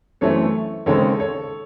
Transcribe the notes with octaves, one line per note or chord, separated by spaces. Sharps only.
F#2 E3 A3 C4 A4 C#5
D#2 C#3 G#3 C4 A4 C#5
A4 C#5